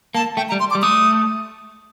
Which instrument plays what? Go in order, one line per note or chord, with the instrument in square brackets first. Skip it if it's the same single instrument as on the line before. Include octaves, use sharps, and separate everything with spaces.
[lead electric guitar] A#3 [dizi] A5
[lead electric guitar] A3 [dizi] G5
[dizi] A#5
[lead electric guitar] G3
[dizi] C6
D6
[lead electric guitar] G3
[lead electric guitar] A3 [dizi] D#6